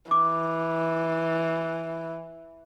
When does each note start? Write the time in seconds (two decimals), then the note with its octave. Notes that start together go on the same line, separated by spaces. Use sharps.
0.11 E3 D6